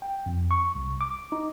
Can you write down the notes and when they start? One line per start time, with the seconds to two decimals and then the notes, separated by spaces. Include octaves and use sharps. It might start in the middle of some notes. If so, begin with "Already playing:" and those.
0.02 G5
0.26 F2
0.51 C#6
0.75 C2
1.01 D6
1.32 D#4